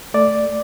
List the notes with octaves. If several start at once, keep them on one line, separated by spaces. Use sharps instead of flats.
A3 D5